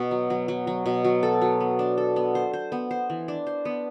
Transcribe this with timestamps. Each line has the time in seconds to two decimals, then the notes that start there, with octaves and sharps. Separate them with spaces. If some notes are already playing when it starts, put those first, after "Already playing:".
Already playing: B2 F#4
0.11 F#3
0.30 F#3
0.48 F#3
0.67 F#3
0.86 B2
1.05 F#3
1.23 A4
1.42 F#3
1.60 B3
1.79 D4
1.98 A4
2.16 B3
2.35 C5
2.53 C5
2.72 B3
2.91 C5
3.10 E3
3.28 D4
3.47 C5
3.65 B3